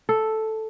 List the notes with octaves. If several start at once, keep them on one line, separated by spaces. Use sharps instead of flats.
A4